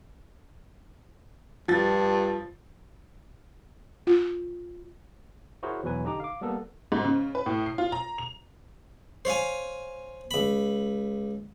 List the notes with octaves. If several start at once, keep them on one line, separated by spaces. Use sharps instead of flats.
G2 F3 A6
F4
E4 F#4 G#4 A#4 C5 C#5
E2 B2 E3 F#3 B4 G#5
D3 D#4 G4 D#5 A#5 D6
F5 D6
G3 A#3 B3 A4 A#4
G#2
C#3
B4
A2
C7
F4
A#5
F7
C5 C#5 F5 G#5
C#2 B5